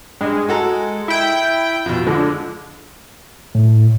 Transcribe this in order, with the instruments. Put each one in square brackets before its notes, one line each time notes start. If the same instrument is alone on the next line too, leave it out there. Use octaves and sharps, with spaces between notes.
[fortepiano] G2 [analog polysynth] G#3
[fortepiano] F#4 A4 A#5
[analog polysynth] E4 G5
[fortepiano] F2 B2
[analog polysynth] D3 [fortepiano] F3 G#3
[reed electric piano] A2